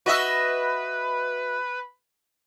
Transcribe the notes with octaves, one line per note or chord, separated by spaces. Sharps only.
F#4 B4 D#5 E5